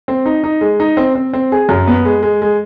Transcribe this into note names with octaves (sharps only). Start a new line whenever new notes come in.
C4
D#4
D#4
G#3
D#4
C4
C4
C4
G#4
F#2
B3
G#3
G#3
G#3